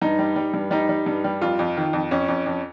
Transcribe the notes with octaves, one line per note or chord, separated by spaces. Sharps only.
G2 D#4
G3
G3
G2
G3 D#4
G3
G2
G3
F2 F4
F2
D#3
F2
F2 C#4
F2
F2